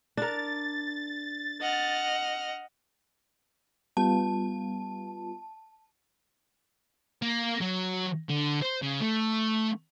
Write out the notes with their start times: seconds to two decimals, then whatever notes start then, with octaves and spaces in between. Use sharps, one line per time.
0.17 D4 A#4 A6
1.59 D#5 F#5 F6
3.97 G3 B3 F4 A5
7.22 A#3
7.61 F#3
8.29 D3
8.62 C5
8.82 C#3
9.01 A3